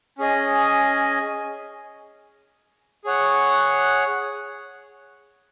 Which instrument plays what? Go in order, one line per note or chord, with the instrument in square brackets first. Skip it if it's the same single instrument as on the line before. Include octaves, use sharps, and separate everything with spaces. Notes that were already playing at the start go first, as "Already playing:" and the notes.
[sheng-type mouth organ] C#4 G#4 D#5 G#5
G#4 C#5 F#5